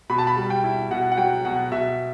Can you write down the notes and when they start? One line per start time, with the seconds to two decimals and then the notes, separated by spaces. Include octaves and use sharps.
0.10 B2 B5
0.18 A5
0.27 B5
0.37 G3
0.50 G5
0.64 E4
0.91 B2 F#5
1.12 F#5
1.17 F#3 G5
1.45 B2 F#5
1.72 B2 E5